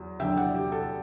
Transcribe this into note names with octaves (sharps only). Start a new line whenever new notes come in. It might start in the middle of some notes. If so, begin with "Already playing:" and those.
Already playing: E2 F#3
E2 D3 F#3 E5 G5
D5 F#5
G4
A4